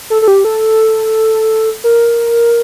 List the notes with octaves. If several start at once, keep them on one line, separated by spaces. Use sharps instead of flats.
A4
A4
G4
A4
A#4